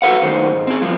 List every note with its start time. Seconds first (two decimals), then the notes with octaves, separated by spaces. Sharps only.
0.02 F#4 A4 B4 F5 F#5
0.22 C2 F#2 D#3 C5
0.51 G#2
0.67 C4 G#4
0.81 G2 F3 G#3